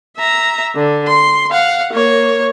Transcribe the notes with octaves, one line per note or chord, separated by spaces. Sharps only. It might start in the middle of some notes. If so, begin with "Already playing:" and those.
E5 A#5
D3
C6
F5 F#5
A#3 C#5